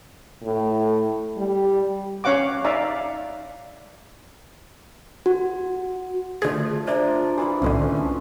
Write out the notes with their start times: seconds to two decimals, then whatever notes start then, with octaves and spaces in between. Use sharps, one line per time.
0.43 A2
1.38 G3
2.24 C#4 C#5 F5 F#5 D6
2.64 D#4 D5 E5 F5 G#5 A#5
5.26 F#4
6.42 D3 F3 A3 G#4
6.87 D4 F4 A#4 C5 D5 E5
7.38 E3 F3 E4 F#4 B5
7.62 C2 A2 D3 A3 C#4 C6